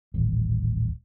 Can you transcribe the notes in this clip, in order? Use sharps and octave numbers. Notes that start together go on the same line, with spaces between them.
D#1 A1